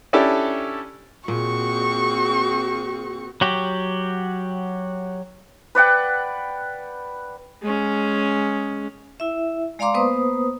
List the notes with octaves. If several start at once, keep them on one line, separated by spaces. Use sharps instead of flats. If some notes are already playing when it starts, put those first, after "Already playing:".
C#4 D4 E4 G4 A4
A#2 C4 F#4 G#4 C#6
F#3 F#4 G4
B4 D5 F#5 G5
G#3 C#4
E4 E5
G#3 D5 F5 A#5 C6 D6
A#3 B3 B4 C5 D#6